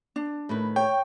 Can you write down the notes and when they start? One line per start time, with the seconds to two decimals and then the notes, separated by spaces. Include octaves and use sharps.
0.16 D4
0.49 A2 D#3 B4
0.76 C#5 G5